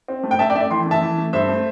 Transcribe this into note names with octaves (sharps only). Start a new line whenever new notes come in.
C4
A3
G5
A3 E5 A5
D5 G5
A3 E5
D5
E3 G5 C6
A3
E5 A5
E3
A3
G2 C5 E5
A3